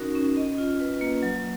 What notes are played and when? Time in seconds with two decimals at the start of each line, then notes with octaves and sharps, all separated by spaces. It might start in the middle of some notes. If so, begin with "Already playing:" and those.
Already playing: C#4 D#4 F#4 A#4
0.15 C#4
0.37 D#5
0.58 F4
0.80 B4
1.01 A#3
1.23 F#3